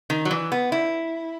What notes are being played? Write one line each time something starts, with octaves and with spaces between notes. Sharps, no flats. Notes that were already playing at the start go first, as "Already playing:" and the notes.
D#3
F#3
E3
B3
E4